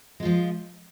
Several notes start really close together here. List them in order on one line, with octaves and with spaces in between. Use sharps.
G#3 F4 F3